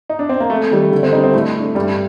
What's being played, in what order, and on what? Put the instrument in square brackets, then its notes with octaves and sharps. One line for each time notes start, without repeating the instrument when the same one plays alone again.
[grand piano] D#4
D4
C4
A#3
[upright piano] F2 [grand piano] A3
[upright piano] D#3 G3
D3
[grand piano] C4
[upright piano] G3 D4 [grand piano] D#4
[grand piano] C4
[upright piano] A2 [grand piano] A3
[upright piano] A3 D4
[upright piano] G2 [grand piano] G3